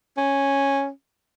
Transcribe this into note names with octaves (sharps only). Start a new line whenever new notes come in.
C#4